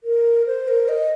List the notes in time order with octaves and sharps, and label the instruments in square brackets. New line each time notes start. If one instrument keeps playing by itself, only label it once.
[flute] A#4
C5
A#4
D#5